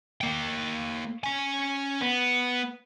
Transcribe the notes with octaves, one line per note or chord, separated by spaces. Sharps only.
A#3 G5
C#4 G#5
B3